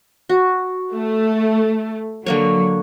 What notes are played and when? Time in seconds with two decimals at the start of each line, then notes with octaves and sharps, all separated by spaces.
0.29 F#4
0.93 A3
2.26 D3 F#3 A#3 C#5